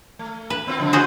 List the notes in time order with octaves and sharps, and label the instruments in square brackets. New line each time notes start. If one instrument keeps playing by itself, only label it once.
[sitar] A3
[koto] B4
[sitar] B3 C4 F4
C#3 F3 A3
[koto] F#4 G#4 C5